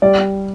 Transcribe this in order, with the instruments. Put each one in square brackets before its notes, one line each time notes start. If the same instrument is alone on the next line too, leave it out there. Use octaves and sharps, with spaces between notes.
[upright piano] G3 [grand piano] D5